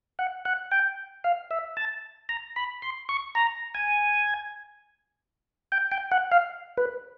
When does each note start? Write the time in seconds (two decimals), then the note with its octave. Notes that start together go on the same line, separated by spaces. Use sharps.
0.19 F#5
0.45 F#5
0.71 G5
1.24 F5
1.51 E5
1.77 A5
2.29 A#5
2.56 B5
2.82 C6
3.09 C#6
3.35 A#5
3.75 G#5
5.72 G5
5.92 G5
6.12 F#5
6.32 F5
6.77 B4